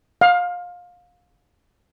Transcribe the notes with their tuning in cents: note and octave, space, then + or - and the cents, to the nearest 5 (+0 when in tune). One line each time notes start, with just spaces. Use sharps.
F5 +25